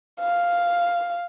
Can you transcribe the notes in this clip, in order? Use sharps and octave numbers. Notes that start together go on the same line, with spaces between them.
F5